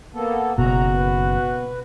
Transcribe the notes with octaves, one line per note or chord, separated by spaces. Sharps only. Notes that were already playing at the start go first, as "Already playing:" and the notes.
A#3 B3 A4
F#1 B2 F#4 A#5
B4